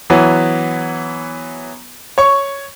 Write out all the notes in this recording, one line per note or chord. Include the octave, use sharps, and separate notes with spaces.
E3 F#3 B3
C#5 C#6